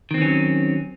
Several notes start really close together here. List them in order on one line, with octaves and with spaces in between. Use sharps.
D#3 C4 E3 C#4 F#3